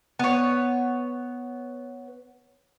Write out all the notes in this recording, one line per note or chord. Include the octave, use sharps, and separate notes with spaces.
B3 C#5